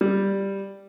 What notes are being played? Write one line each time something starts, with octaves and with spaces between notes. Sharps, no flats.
G3